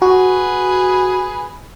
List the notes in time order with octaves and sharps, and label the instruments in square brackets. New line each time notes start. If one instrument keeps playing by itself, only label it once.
[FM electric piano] F#4 [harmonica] G#4 B4